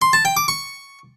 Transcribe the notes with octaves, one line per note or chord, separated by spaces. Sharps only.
C6
A5
G5
D6
C#6